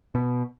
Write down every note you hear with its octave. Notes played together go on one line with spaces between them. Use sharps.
B2